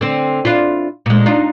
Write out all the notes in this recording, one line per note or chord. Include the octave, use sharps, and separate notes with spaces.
D3 C4
D4 E4 F4
A#2 G#3
D4 D#4 F4